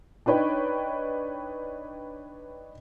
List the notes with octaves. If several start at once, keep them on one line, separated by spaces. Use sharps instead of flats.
D4 D#4 B4 C#5 G5